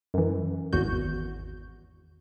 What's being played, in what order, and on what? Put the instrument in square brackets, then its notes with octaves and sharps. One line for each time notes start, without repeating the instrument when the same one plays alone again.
[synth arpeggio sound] F#2 E3
G#1 E2 F#4 G6